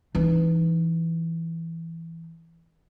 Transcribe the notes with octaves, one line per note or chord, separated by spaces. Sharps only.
E3 D#4